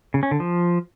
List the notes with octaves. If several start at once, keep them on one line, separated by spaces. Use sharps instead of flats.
C#3
C#4
D3
F3